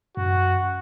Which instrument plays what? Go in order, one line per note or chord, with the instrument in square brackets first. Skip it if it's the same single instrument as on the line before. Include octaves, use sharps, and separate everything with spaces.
[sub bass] F#2 [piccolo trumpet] F#4